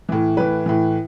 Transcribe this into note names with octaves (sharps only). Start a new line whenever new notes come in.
A2 E3
A2 E3 B4
A2 E3